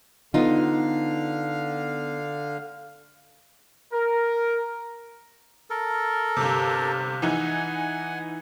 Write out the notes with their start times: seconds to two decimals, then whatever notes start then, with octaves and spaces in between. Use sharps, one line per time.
0.34 D3 B3 D#4 F4 F5
3.93 A#4
5.70 A4 A#4
6.37 G1 C3
7.22 E3 D#4 F#5 G#5 G#6